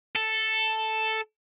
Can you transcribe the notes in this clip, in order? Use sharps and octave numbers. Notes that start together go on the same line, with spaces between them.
A4